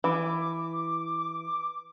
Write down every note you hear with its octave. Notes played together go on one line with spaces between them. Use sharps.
E3 D6